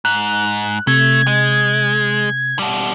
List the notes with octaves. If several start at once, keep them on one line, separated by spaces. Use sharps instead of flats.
G#2 F#6
C3 A3 G#6
G#3
B2 G3